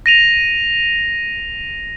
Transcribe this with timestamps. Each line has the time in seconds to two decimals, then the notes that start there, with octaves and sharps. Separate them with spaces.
0.06 A#6 D#7 F7